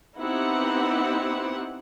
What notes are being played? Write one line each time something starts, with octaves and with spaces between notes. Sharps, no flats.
B3 C4 D#4 E4 G4 F#5